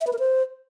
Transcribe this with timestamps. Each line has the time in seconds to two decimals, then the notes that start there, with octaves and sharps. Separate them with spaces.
0.01 E5
0.07 B4
0.13 A#4
0.19 C5